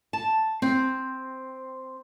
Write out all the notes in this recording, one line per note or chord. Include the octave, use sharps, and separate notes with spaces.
A5
C4